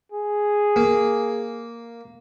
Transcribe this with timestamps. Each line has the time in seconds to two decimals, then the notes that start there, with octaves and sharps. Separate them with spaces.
0.12 G#4
0.76 A#3